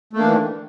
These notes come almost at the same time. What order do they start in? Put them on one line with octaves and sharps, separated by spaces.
A3 A#3 D4 E3 D#3